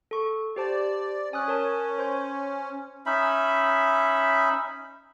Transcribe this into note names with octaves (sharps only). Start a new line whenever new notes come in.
A4 C#6
G4 C5 D5 A5
C#4 G#5 D#6 F#6
A#4 C#5 A5
C5 C6 G6
C#4 D#4 E5 B5